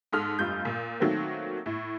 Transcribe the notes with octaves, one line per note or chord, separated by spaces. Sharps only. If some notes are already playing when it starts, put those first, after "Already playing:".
G#2 A4 D#6 F6
F1 G2 F4 G6
A#2
D#3 F#3 A3 A#3 C4
A2